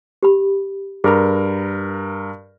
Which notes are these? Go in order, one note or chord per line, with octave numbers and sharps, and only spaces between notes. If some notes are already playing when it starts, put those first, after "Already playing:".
G4 B5
G2 G#4 A#4 B5